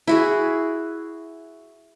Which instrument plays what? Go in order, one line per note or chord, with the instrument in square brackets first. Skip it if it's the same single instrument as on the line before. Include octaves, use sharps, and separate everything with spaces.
[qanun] E4 F#4 G#4